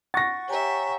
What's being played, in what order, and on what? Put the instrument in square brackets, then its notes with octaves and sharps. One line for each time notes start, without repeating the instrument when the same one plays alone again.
[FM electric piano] F#5 C#6 [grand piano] A6 A#6
[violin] G4 E5 [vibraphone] C#5 G#5 A#5